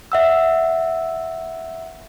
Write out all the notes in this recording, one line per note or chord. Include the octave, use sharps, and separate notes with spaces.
E5 F#5 E6